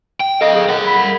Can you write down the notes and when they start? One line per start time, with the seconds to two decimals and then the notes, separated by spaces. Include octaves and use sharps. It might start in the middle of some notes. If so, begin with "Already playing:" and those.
0.20 G5
0.41 A4 D#5 F5
0.55 G#4
0.69 A#4 F#5
0.86 B5
1.03 G3